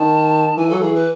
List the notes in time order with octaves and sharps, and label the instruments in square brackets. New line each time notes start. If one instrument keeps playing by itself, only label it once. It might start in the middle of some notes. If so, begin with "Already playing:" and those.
Already playing: [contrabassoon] D#3 [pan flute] A5
[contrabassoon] E3 [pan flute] G#5
[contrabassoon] F#3 [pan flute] A4
[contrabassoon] E3 [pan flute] G#4
[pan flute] B4